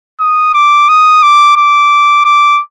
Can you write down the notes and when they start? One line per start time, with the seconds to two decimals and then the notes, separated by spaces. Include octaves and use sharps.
0.20 D#6
0.54 D6
0.89 D#6
1.23 D6
1.56 D6
2.25 D6